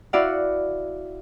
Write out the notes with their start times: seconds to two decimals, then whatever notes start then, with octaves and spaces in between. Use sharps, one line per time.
0.13 E4 F#4 D5 F5 F#5